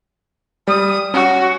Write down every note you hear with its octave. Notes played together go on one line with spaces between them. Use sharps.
G3 D#6
C#4 F#4